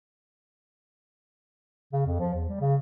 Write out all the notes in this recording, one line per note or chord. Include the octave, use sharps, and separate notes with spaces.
C#3
F2
F3
E2
G3
C#3